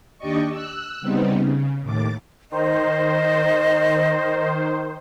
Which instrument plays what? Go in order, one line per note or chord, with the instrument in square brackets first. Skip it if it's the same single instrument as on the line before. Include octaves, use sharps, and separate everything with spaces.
[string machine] D#2 D4 G4 D5 D#5 C#6
E6 F#6
C#3 G3 B3 C4 D#4
C#3
D#2 A2 D6 A6
[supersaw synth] D#3 C5 [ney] D#5